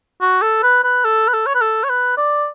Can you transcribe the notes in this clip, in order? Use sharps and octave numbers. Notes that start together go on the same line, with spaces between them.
F#4
A4
B4
B4
A4
B4
A4
C#5
B4
A4
C#5
B4
D5